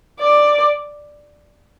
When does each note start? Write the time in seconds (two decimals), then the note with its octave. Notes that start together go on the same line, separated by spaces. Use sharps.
0.19 D5